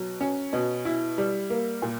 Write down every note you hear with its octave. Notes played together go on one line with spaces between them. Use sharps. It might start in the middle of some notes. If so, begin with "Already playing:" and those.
Already playing: B2 F#3
C#4
B2
E4
G3
A#3
A#2